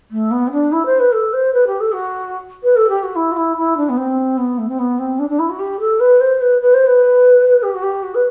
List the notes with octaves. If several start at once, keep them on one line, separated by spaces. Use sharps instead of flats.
A3
B3
C4
D4
E4
C5
B4
A4
C5
B4
G4
A4
F#4
B4
A4
G4
F#4
E4
F#4
E4
E4
D4
B3
C4
B3
A3
C4
B3
C4
D4
D4
E4
F#4
G4
A4
B4
C5
B4
B4
C5
B4
G4
F#4
G4
F#4
B4